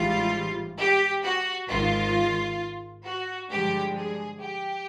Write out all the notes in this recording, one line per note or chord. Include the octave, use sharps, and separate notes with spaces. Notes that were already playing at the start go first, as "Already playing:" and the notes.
Already playing: A1 G#2 E3 G3 F4
G4
F#4
G#1 G#2 D#3 F4
F#4
G2 D3 F3 G#3 G4
G#4
G4